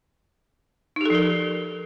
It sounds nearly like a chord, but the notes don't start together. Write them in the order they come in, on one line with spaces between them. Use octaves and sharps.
D#4 G4 A4 F3 A#4